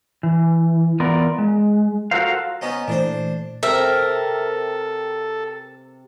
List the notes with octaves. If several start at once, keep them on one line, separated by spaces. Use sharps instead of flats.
E3
E3 B3 F4 A#4 D5
G#3
F4 F#4 A4 A#4 C5 F5
B3 C#4 D#4
A#2 E3 A3 D4 C5
C3 A4 A#4 E5